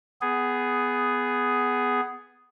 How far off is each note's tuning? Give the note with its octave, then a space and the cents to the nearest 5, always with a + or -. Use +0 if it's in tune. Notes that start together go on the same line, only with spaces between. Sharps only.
B3 +15 G#4 +0